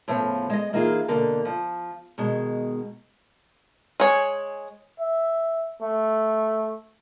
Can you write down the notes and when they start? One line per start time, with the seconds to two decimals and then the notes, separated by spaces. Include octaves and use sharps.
0.08 A2 C#3 F3 B3
0.50 G#3 D#5
0.73 E3 A#3 D#4 F4 G#4
1.08 B2 D3 A#3
1.45 F3
2.18 B2 D#3 G#3
4.00 G#3 C#5
4.99 E5
5.81 A3